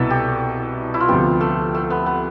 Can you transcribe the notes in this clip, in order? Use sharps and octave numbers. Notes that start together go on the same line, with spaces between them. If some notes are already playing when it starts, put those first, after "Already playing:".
Already playing: C2 B2 B3 E4 A4
G4
E4
F4
D2 C3 F3 B3 G4
A3
A3
B3
B3